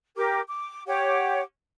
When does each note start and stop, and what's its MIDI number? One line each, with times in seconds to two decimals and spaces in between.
0.16 0.40 67
0.16 0.40 70
0.16 0.40 86
0.47 0.83 86
0.87 1.41 67
0.87 1.41 73
0.87 1.41 78
0.87 1.41 86